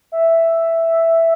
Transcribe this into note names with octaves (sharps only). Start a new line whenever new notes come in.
E5